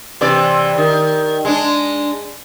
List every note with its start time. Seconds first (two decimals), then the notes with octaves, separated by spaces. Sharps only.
0.21 C3 E3 D5
0.78 D#3
1.45 G#3 D4